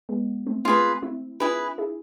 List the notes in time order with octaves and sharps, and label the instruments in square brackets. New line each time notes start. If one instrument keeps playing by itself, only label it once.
[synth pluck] G#3 B3
A3 C4
[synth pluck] A3 C4 [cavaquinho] F4 G#4 B4
[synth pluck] C4 E4
[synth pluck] D4 F4 [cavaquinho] E4 G#4 B4
[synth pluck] E4 G#4